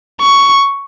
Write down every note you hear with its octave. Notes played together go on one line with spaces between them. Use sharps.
C#6